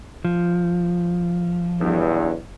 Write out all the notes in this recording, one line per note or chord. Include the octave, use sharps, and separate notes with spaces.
F3
B1 E2 G2